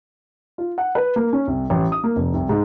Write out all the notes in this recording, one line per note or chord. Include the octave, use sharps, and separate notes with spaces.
F4
F#5
B4
A#3
C#4
C2
A1
D#6
A#3
F1
C2
G#2